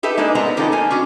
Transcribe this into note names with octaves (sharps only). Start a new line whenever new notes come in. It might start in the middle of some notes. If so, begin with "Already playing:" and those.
D#4 G4 A4 B4 E5
G#3 A#3 D4 D#4
B3 C4 D#4 A#4
D#3 G3 C#4 D#4 F4 A4
A#3 G#5
C#4 D4 F#4